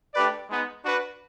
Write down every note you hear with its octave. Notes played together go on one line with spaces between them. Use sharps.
A3 D4 G4 B4 D5
G#3 B3 D#4
D4 F#4 B4